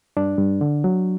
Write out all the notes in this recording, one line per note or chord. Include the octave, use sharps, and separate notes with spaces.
G2 D4
G2
D3
F#3